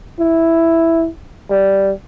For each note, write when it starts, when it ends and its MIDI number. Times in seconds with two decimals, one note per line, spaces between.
0.20 1.08 64
1.51 1.91 55